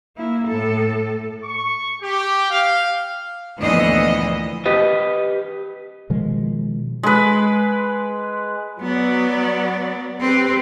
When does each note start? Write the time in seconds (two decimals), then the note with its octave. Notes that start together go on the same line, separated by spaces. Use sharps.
0.16 A#3 E4
0.48 A2 A4
1.43 C#6
2.01 G4
2.50 F5
3.61 D2 A#2 E3 F3 B3 D#5
4.66 G4 B4 D#5
6.10 B2 D#3 F3 G#3
7.03 G#3 B4
8.82 F#3 B3 D5
10.21 C4 G4 B4